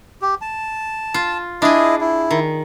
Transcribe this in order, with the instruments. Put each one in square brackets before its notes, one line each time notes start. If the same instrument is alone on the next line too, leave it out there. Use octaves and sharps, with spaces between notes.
[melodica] G4
A5
[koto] F4
[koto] D4 G#4 [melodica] E4 D#5
[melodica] E4
[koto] D#3